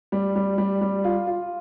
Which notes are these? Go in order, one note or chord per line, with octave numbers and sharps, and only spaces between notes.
G3
G3
G3
G3
F4
F4